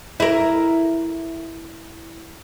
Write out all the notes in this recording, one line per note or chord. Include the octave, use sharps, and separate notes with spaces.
E4 A#4